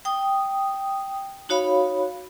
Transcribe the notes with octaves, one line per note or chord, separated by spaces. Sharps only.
G5 D#6
D#4 F#4 C#5 F5 B5